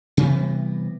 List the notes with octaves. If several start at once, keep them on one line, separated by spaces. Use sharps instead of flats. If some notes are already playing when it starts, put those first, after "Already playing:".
C3 E3 G3 B3